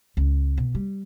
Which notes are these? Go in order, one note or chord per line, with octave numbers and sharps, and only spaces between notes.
C#2
B2
G3